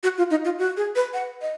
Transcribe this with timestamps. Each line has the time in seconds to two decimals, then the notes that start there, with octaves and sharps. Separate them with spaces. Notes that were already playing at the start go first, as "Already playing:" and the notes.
0.03 F#4
0.18 F4
0.31 D#4
0.45 F4
0.58 F#4
0.77 G#4
0.95 B4
1.14 F#5
1.42 D#5